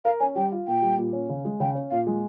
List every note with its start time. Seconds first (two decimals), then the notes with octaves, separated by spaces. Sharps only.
0.05 A#4 F5
0.20 C#4 G#5
0.35 G3 G5
0.52 F4
0.68 A#2 G5
0.82 G3
0.98 A#2
1.13 C#4
1.29 C#3
1.45 G#3
1.60 C#3 G5
1.75 C#4
1.90 A#2 F5
2.07 G#3